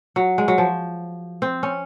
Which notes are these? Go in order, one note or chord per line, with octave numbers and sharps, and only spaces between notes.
F#3
G#3
F#3
F3
C4
C#4